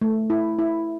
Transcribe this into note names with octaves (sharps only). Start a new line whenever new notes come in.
A3
E4
E4